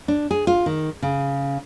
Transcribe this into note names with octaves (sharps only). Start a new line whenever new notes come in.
D4
G#4
F4
D#3
C#3